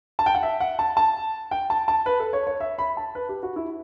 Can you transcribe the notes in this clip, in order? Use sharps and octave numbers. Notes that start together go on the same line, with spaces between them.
A5
G5
F#5
E5
F#5
A5
A5
G5
A5
A5
B4
A4
C#5
C#5
E5
B5
A5
B4
G4
F#4
E4